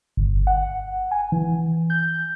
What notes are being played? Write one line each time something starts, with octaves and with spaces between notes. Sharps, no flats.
G1
F#5
G#5
E3
G6